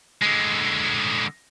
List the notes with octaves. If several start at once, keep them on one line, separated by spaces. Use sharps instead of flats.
D3 G#3